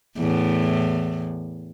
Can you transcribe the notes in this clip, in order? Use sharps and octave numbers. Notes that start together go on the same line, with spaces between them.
E2 A2